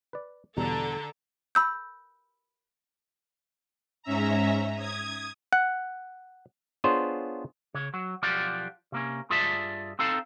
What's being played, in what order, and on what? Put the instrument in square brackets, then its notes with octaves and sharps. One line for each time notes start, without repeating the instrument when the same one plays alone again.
[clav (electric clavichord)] B4 D5
[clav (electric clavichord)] E2 B2 G3 [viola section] D3 A4 [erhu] A#5
[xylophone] B5 E6 G6
[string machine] G#2 C#4 E5 A#5
D#6 G#6
[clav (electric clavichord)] F#5
B3 D4 F4 G#4 C5 C#5
[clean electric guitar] C#3 C#5
F#3
B1 F3 F4 G4 D5 F#5
C3 A#3 C#4
G2 F4 G#4 D5 E5 A5
C4 D#4 A4 F5 A5